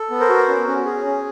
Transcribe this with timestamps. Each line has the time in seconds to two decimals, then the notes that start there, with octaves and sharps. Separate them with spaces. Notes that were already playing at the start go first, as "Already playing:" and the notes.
Already playing: A4
0.10 B3
0.20 A#4 C5
0.29 F#4
0.48 C#4
0.68 C#4
0.86 G#4
1.05 C#4